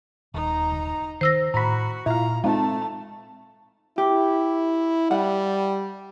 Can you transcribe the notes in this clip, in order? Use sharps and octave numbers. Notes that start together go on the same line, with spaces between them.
D#1 D#4 A#5
G1
D#3 C5 E6 A#6
A2 F#4 A#5 B5
A#2 E4 F4 F5 A#5
G#3 A3 C4 D#4 F4 A5
E4 G4
G3 F#5